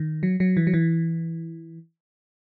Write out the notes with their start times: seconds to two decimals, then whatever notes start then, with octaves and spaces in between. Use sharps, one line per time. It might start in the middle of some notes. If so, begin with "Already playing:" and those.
Already playing: D#3
0.23 F#3
0.40 F#3
0.57 E3
0.67 F#3
0.74 E3